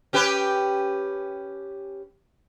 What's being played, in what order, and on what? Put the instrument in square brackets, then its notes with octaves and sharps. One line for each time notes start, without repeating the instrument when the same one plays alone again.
[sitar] C#4 G4 B4